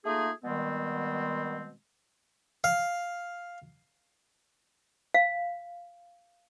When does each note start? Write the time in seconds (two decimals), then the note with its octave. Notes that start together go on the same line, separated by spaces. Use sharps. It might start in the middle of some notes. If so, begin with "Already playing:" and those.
0.05 A3 A#3 D#4 F4 G#4
0.44 B2 D#3 G3 G#3 B3 C4
2.64 F5
5.14 F5